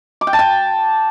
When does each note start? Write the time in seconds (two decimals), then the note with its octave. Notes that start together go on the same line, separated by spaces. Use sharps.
0.21 D6
0.27 G5
0.33 A5
0.39 G5